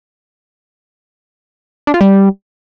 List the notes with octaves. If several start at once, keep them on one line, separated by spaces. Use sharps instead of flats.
D4
F4
G3